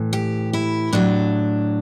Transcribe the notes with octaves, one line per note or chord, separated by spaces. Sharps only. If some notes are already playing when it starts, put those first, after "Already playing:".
Already playing: A2 E3
G4
E4
A2 F#3 D4